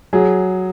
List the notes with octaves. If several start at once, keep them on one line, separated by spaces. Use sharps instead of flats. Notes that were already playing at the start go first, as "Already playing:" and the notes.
F#3 G#4